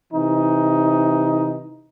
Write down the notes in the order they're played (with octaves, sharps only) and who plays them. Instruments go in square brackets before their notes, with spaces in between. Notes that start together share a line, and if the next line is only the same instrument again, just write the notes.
[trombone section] C3 E3 D#4